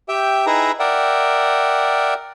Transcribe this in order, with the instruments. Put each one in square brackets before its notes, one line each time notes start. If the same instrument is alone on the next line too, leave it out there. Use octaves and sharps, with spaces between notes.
[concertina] G4 E5 G5
D#4 E4 G#4 B4 E5 A#5
A#4 D5 E5 F#5 G5